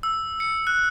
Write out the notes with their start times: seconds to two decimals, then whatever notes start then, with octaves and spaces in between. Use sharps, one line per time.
0.03 E6
0.40 C#7
0.67 F#6